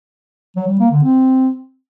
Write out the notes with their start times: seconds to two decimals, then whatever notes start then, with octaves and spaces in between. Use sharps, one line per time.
0.56 F#3
0.68 G3
0.80 A#3
0.91 D3
1.03 C4